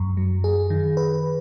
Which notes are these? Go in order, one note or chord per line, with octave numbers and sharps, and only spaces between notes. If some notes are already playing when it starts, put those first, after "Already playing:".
Already playing: F#2
F#3
G#4
D#3
B4